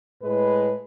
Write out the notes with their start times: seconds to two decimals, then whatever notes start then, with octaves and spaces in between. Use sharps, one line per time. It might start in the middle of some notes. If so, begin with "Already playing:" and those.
0.22 A2 G#3 B4